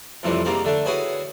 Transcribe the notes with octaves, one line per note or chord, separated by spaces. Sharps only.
F2 A2 C3 E3 G3 C4
C2 G#2 G3 A#3 C4 D5
D3 A3 D4
E4 F#4 G#4 B4 C#5 G#5